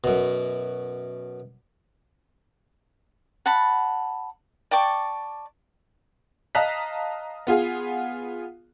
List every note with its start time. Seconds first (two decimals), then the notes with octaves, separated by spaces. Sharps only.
0.04 F#2 B2
3.46 F#5 A5 B5
4.71 D5 G5 A5 C#6
6.55 D#5 F5 A5 A#5 F#6 B6
7.47 B3 F4 G#4 F5